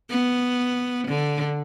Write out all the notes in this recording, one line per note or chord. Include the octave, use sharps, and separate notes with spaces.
B3
D3